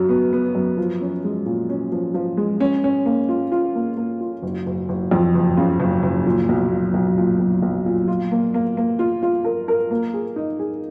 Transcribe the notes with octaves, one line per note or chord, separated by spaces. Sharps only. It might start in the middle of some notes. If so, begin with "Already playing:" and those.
Already playing: F#2 C#3 F#3
B3
B3
F#2
F3
C#4
G#3
A#2
C#4
F3
F3
G#3
C#4
C#4
A#3
F4
F4
A#3
A#3
F4
F#1
F#1
F#1
F2
F#1
C#3
F#1
F#1
A#2
B1
A#2
B1
A#2
B1
B1
A#2
F4
A#3
A#3
A#3
F4
F4
A#4
A#4
A#3
G#4
D#4
G#4